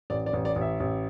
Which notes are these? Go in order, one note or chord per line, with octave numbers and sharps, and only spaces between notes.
A1 D5
D5
A1
D5
A1
E5
A1